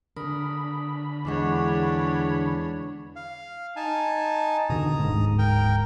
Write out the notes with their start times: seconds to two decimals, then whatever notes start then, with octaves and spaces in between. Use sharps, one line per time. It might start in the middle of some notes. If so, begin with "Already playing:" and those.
0.17 D3 A#4 B5 D#6
1.25 E2 G#3 D4 C#5 F#5 C#6 D6
3.16 F5
3.76 D#4 G#5 A5
4.70 B2 D3 D#3 A#5 D#6
4.99 D1 G#2
5.38 A#4 G5